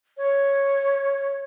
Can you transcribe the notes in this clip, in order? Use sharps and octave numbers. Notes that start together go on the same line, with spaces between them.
C#5